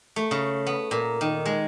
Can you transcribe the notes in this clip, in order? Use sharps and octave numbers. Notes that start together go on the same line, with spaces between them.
A3
C#3
B3
A#2
D#3
G#3